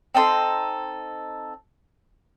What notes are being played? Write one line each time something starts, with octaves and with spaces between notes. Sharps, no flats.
C4 D#4 A4 C6